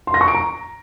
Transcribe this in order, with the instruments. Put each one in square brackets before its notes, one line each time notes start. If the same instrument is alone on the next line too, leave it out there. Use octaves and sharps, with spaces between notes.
[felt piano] C6
A#6
C#6
D7
A#5